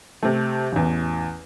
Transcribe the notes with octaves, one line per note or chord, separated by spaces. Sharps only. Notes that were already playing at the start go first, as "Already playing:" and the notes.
C3 A3
A1 E2